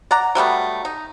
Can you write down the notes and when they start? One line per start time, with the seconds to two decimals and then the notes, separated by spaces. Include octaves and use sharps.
0.11 D5 F#5 A#5
0.35 F#3 G3 A3 B3
0.85 D#4